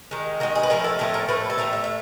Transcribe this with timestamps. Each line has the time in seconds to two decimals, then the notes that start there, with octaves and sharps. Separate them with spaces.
0.11 D#3 G#3
0.40 D#3 G#3 F#4
0.55 G#4
0.63 B4
0.70 A2 F3 A3 A#4
0.84 A4
0.99 A2 F3 A3 A4
1.14 A#4
1.28 A2 F3 A3 B4
1.50 A4
1.58 A2 F3 A3 A#4
1.73 E5
1.84 E5